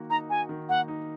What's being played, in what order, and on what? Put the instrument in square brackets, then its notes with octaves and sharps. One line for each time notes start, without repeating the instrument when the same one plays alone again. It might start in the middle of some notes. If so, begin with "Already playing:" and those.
Already playing: [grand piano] D#3 A#3 F#4
[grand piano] D#4 [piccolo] A#5
[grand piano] F#4 [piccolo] G#5
[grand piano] D#3
[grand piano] A#3 [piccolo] F#5
[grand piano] D#4